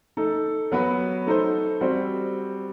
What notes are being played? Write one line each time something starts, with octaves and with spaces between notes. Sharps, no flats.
A3 D#4 A4
F#3 B3 F#4 B4
A3 D#4 A4 C5
G3 C4 F#4 C5